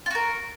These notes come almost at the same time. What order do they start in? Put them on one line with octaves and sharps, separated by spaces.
F4 F#4 A#4